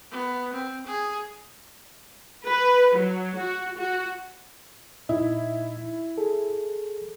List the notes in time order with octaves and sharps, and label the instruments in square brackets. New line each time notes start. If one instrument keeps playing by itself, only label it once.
[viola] B3
C4
G#4
[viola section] B4
F#3
F#4
F#4
[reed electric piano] A#2 D#4 D#5 [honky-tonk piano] E4
[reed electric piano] G#4 A4